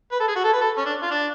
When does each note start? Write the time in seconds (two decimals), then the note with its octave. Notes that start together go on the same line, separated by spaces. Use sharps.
0.12 B4
0.20 A4
0.28 G#4
0.36 F#4
0.44 A4
0.53 B4
0.61 A4
0.77 C#4
0.86 D4
1.02 F4
1.11 D4